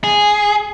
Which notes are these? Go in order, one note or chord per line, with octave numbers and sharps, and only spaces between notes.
G#4